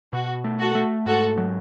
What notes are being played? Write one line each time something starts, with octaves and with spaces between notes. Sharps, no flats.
B2 F#4
A3
F#4 A4
A3
G#2 F#4 A4
F#3